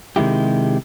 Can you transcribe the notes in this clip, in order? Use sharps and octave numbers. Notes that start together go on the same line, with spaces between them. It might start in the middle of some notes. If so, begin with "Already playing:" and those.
C3 D#3 G#3 E4 G4